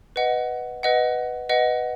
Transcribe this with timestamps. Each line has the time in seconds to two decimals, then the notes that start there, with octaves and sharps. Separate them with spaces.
0.16 B4 D#5 F#5
0.83 B4 D#5 F#5
1.50 B4 D#5 F#5